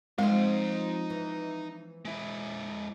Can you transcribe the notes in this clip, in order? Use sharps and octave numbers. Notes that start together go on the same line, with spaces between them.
F3 G#3 C4 D#4 C6
E3
G#3 E4